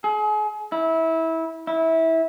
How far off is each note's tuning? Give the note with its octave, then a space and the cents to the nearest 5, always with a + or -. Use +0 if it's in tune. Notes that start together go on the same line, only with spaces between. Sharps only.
G#4 +35
E4 -20
E4 -20